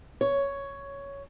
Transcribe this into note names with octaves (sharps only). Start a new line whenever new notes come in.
C#5